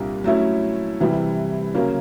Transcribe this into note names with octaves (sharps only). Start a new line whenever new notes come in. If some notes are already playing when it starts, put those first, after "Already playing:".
Already playing: C2 A#2 G3 A#3 D4
F#3 A3 C#4 E4
C3 E3 G3
C#3 F#3 A#3 C#4